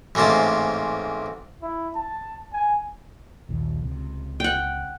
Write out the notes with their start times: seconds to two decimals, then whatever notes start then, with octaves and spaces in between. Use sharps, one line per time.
0.15 A1 G#2 C3 A#3 A5
1.62 E4
1.95 A5
2.53 G#5
3.49 A#1 D#2
3.84 C#2 C3
4.40 F#5 G5